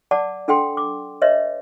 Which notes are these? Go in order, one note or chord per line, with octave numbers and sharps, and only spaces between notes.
D5 F#5 A5 D6
D4 A4 F#5 G5 C6
D6
B4 C#5 D#5 E5